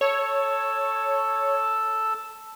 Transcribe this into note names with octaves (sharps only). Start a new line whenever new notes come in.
A4 C#5